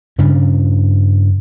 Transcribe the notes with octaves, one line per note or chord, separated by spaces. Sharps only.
G2 C#3 C#4 D4